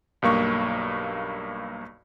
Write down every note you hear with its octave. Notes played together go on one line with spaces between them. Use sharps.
B1 G2 A#3 C#6